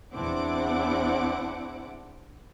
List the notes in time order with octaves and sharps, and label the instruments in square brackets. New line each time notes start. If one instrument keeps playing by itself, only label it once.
[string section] E2 C4 D4 E4 F#5 D6